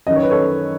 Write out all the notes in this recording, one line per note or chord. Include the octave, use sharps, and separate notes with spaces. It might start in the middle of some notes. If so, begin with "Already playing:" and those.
F#2 D#3 D#5
C#5
B4
A4 C#5